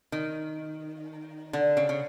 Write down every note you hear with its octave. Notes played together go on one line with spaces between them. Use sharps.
D#3
D3
C#3
C#3